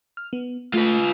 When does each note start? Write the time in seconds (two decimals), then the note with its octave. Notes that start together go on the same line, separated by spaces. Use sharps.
0.17 F6
0.33 B3
0.74 A3 F4 B4